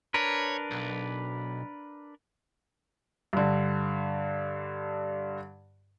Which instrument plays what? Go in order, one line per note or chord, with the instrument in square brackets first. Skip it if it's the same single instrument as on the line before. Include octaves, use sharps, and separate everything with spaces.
[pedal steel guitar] D4 A#4 B4 [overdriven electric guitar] C#5
[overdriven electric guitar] B1
[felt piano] G2 D3